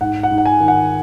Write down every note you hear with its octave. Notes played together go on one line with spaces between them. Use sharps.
G#2 F#5
F#5
G#2
F#5
G#5
D#3
F#5